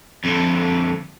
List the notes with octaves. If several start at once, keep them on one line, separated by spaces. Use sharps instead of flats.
F2 D3